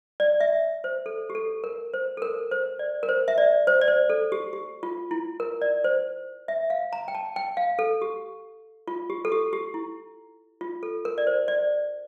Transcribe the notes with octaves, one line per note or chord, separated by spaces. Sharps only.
D5
E5
C5
A4
G4
A4
A#4
C5
A4
A#4
C5
D5
A#4
C5
E5
D5
C5
D5
C5
A4
G4
G4
F4
E4
A#4
D5
C5
E5
F5
A#5
G5
A5
G5
F5
A4
G4
F4
G4
A4
G4
G4
E4
F4
A4
A#4
D5
C5
D5